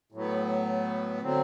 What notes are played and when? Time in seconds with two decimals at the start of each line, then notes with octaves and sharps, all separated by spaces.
0.12 A2 F#3 B3
1.22 D3 F#3 C4